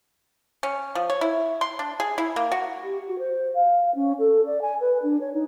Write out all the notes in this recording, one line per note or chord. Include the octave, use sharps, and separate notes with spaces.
C#4
F3
C#5
E4
C6
D4
G#4
E4
A#3
F#4
G4
F#4
C5
F5
C#4
A4
D5
G#5
B4
D4
C#5
D#4